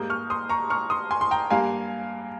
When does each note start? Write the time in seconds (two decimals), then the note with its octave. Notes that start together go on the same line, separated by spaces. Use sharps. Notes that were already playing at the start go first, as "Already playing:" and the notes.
Already playing: G#2 G3 A#3 D#6 G6
0.10 C#6 F6
0.30 C6 D#6
0.49 A#5 C#6
0.70 C#6 F6
0.90 C6 D#6
1.11 G#5 C6
1.21 C6
1.31 G5 A#5
1.50 G2 G3 A#3 F5 G#5